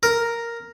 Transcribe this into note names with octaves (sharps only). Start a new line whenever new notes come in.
A#4